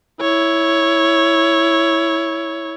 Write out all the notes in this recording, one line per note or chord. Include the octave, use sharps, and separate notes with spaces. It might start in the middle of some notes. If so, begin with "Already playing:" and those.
E4 C#5